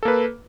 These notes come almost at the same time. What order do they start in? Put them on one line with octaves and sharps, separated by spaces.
A4 A#3 B4